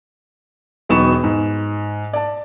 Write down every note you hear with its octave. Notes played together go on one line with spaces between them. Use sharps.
E1 F#3 B3 D#4 C#6 E7
G#2
D5 A5